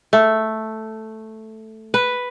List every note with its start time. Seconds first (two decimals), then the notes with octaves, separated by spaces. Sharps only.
0.13 A3
1.94 B4